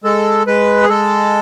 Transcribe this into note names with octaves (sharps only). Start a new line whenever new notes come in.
G#3 A4
G#3 B4
G#4
G#3 A4